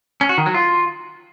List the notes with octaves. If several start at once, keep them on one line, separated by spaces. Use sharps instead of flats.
C#4
F#4
D#3
F#3
F4